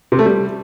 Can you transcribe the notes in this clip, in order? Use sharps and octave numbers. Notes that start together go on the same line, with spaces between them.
C3
A3
G3